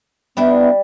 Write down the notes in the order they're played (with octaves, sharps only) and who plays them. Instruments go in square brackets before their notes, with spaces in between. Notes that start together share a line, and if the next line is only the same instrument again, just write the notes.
[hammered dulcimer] G3 [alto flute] B3 [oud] D4 E4 B4